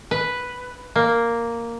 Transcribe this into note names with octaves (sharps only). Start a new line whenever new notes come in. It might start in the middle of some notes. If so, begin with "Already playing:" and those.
B4
A#3